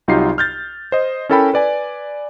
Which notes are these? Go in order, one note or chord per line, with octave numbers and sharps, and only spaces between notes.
C2 F#3 D#4 F4 G4 C7
F6 G6 A6
C5 D#5
C#4 E4 A4 A#4 G5 B5
B4 D5 G#5